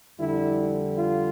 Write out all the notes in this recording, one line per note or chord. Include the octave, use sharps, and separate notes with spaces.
F2 D3 G3 E4
F4